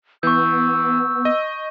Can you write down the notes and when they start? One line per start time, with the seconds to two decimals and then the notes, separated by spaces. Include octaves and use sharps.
0.23 E3 B3 C#6 E6 G6
1.25 D#5